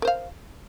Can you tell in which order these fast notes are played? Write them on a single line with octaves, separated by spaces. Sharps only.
A#4 C5 F5